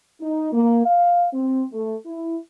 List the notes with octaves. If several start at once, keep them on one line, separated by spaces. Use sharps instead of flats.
D#4
A#3
F5
C4
A3
E4